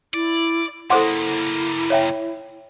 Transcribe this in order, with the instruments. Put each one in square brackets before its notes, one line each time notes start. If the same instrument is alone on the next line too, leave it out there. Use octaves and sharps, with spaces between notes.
[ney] E4 [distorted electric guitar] D5
[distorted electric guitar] C#3 A#3 [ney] E4 [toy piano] A4 C5 C6 [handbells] F#5 D6
[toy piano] C#5 E5 G5